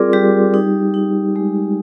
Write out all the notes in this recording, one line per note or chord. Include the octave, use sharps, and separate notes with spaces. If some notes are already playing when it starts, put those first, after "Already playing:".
Already playing: G3 C4 F4 G#4 A#4 D5 C6 D6
G3 G4
D#4
D#4
G#3